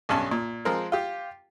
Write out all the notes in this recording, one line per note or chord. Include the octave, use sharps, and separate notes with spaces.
B1 G2 C#4 A5
A#2
F3 G#3 C4 A#4
F4 G4